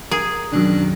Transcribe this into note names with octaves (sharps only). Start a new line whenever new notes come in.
G#4 A#4
B1 F#2 D#3 D4